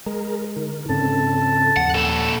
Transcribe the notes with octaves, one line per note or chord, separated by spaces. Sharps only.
G#3 G#4 A#4 A#5
D3 D#4 A#4
G#2 C#3 C4 C#4 A4 A5
D#2 F3 F#5
A#2 A4 F#5 G#5